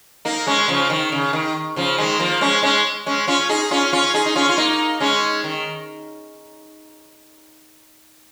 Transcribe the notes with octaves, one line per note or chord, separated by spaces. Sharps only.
A#3 D#4
G#3 C#4
C#3 F3
D#3
C#3
D#3
C#3 F3
D#3 G#3
F3 A#3
G#3 C#4
G#3 C#4
G#3 C#4
C#4 F4
D#4 G#4
C#4 F4
C#4 F4
D#4 G#4
D#4
C#4 F4
F4
A#3 D#4
G#3 C#4
D#3